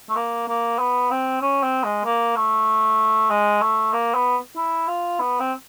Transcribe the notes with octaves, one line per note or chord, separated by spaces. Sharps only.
A3
A#3
A#3
B3
C4
C#4
C4
G#3
A#3
A3
G#3
A3
A#3
B3
E4
F4
B3
C4